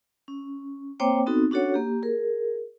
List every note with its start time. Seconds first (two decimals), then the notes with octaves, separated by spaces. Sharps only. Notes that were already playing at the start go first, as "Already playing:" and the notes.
0.28 C#4
1.00 A#3 C4 C5 C#5 G5 D6
1.26 B3 C4 D#4 F#4 A4
1.51 C#4 D4 F#4 A4 C#5 F#5
1.74 A#3 G4
2.03 G#4 A#4